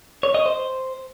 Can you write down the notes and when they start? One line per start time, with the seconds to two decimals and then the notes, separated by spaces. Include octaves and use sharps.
0.23 C#5
0.34 D#5
0.46 C5